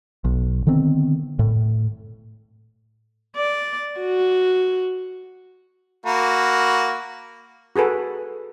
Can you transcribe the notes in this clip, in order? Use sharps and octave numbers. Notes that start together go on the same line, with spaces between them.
B1
D3 D#3 B3 C4
A2
D5
F#4
A#3 F#4 B5
F#4 G#4 A4 B4